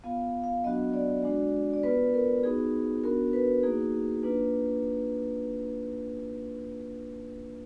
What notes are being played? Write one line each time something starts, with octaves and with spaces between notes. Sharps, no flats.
B3 F4 F5
F5
F#3 B3 D4 F#4 D#5
D5
G#3 D4 F#4
D5
B3 F4 B4
A#4
B3 D#4 F#4 G#4
B3 D4 F#4 A#4
B4
A#3 D#4 F#4 G#4
A#3 D4 F4 B4